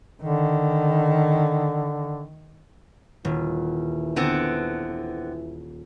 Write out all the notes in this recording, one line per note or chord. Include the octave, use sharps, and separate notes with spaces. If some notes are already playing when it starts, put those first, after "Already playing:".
D3 D#3
D#1 E3
D3 B3 C4